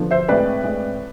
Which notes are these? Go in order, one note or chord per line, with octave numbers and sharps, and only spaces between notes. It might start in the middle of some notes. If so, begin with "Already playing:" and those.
Already playing: D3 F3 B3 D4
C5 E5
A2 G#3 C4 B4 D5
A2 G#3 C4